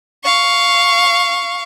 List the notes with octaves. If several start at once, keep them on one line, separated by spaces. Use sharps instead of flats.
F5 C#6